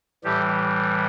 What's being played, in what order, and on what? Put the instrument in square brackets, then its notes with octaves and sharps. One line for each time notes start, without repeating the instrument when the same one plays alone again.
[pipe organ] A2 E3 G3 G4